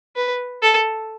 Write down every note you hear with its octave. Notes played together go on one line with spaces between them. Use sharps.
B4
A4